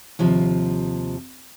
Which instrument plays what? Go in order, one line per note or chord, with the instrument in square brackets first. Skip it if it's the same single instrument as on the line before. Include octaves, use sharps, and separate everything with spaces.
[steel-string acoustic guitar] D#2 C3 F3